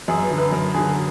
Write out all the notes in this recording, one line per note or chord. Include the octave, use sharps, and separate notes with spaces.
F#2 G#4
B4
D3 F#3
B4
F#2 A#4
D3 F#3 G#4